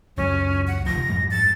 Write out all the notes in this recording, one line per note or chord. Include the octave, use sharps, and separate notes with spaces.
C#2 F#2 F#3 C#4
F#5
F1 D2 F3 A#6
F2 G#2 G3
A6